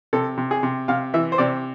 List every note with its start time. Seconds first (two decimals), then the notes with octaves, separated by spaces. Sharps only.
0.13 C3 A4
0.38 C3
0.51 G#4
0.63 C3
0.88 C3 F5
1.14 E3 E5
1.32 C5
1.38 C3 D5